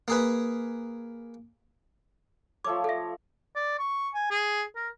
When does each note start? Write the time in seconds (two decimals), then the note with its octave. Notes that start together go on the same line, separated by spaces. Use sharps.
0.08 A#3 G#4 B4
2.64 F3 A3 C#5 D6
2.84 A4 E5
3.56 D5
3.79 C#6
4.14 G#5
4.31 G#4
4.76 A#4